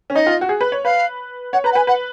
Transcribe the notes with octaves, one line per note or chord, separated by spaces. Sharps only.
C#4
D#4 D#5
F4
F#4
G#4
B4
C#5
B4 F5
C#5 F#5
B4 A#5
F#5
B4 G#5
B4 F#5